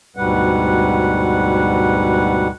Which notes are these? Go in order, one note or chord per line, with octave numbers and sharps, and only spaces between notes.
D2 G#2 B2 G3 B4 F#5